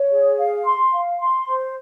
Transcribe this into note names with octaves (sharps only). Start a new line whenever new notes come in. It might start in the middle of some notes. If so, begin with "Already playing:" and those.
Already playing: C#5
G#4
F5
C6
F5
C6
C5